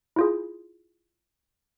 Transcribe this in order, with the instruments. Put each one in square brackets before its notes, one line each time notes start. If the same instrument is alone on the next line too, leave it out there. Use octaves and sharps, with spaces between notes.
[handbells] E4 F4 G#4